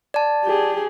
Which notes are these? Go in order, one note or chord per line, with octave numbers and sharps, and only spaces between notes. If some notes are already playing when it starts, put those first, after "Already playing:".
D5 A5
G4 G#4